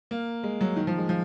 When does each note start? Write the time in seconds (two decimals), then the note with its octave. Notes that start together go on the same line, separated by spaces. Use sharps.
0.11 A#3
0.43 G#3
0.61 F#3
0.76 D#3
0.87 F3
0.98 G#3
1.09 F3